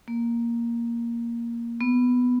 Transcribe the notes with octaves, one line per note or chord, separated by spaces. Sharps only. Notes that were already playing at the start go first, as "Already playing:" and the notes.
A#3
B3